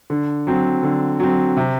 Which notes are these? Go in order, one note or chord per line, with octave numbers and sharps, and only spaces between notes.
D3
F#3 C4
D3
F#3 C4
C3